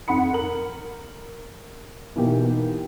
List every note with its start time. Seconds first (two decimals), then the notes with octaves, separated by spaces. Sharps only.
0.08 F2 F#5 B5 C#7
0.33 A#4 F#7
2.16 B2 E3 A#3 D#4 G4